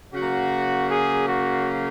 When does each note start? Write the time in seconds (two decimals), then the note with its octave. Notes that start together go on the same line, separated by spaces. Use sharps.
0.14 C#3 F#3 A#3 F#4
0.90 G#4
1.27 F#4